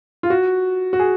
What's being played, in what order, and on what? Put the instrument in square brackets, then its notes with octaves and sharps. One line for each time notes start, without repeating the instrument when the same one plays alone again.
[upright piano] F4
F#4
F#4
G#4